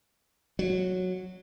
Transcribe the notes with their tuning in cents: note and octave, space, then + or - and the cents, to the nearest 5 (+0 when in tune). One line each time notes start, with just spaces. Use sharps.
F#3 -10